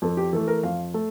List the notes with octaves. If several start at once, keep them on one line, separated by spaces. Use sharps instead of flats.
F2 A4
G4
E3 A3 A4
A#4
F2 F5
A3